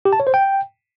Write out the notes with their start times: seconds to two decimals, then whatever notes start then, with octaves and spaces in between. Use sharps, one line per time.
0.05 G4
0.13 A5
0.20 C#5
0.27 C5
0.34 G5